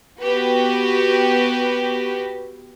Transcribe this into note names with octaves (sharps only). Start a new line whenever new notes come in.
B3 F#4 G4 B4